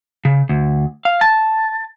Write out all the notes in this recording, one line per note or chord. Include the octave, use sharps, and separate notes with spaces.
C#3
D2
F5
A5